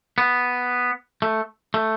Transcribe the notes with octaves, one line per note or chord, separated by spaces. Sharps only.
B3
A3
A3